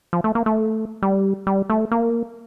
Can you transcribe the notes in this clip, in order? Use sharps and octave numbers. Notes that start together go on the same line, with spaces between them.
F3
A3
A#3
A3
G3
G3
A3
A#3